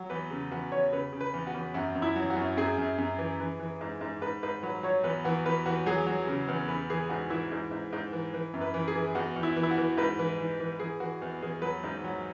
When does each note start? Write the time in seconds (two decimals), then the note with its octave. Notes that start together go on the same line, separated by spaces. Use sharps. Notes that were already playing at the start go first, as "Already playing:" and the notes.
Already playing: F#3
0.10 E2 B4
0.31 C#3
0.51 E2 F#4
0.72 E2 C#5
0.92 C#3 B4
1.13 C#3
1.21 B4
1.34 E2
1.47 F#4
1.54 E2
1.74 F#2 F#4
1.95 F#2
2.02 E4
2.16 F#3
2.30 F#4
2.36 F#2
2.57 F#2 G#4
2.78 F#2
2.98 F#2
3.18 E3
3.40 E3
3.59 E3
3.81 G#2
4.01 G#2
4.22 G#2 B4
4.43 G#2 B4
4.63 F#3 B4
4.83 F#3 C#5
5.03 E2 B4
5.25 E3 F#4
5.45 E2 B4
5.66 E3 F#4
5.86 F#3 G#4
6.06 F#3
6.27 C#3
6.48 E2
6.68 E3 B4
6.90 E3 G#4
7.09 G#2 F#4
7.30 E3 E4
7.52 G#2
7.71 G#2
7.93 G#2
8.13 E3
8.34 E3
8.54 F#2
8.61 B4
8.74 E3
8.88 G#4
8.96 E3
9.15 E2 F#4
9.36 E2
9.43 E4
9.56 E3
9.63 E4
9.71 F#4
9.78 E3
9.97 G#2 B4
10.19 E3
10.39 E3
10.60 E3
10.80 E3 G#4
11.00 E3 F#4
11.22 E2
11.42 E2 G#4
11.62 F#3 B4
11.84 G#2
12.04 F#3